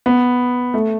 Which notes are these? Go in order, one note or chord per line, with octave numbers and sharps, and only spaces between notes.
B3
A3